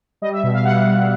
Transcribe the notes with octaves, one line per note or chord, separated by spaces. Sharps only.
G3 D#5
E5
B2 E5
F5
G3 F#5
G3